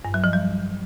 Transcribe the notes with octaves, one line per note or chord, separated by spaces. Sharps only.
G2
F#3
F3
G3